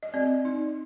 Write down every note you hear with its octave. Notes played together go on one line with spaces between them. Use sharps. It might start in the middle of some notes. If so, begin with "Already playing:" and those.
D#5
C4 D5
D#4